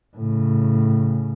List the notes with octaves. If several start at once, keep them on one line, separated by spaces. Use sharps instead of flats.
A2 C#3